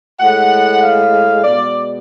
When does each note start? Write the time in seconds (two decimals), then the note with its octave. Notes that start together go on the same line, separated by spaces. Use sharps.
0.20 A2 G#3 F#5
0.82 F5
1.44 B2 G#3 D5